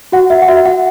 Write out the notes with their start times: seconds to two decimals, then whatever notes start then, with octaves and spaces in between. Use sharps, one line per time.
0.12 F#4 F#5
0.30 E5
0.42 F#5
0.48 F#4 E5
0.65 F#5